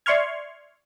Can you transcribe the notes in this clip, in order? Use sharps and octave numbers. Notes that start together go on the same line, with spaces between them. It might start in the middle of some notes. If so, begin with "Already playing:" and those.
D5 E5 C6 C#6 F6 G#6